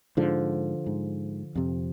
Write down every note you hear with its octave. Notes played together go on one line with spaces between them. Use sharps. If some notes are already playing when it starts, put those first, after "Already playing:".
G#2 D3 F3
G#2
F2 C3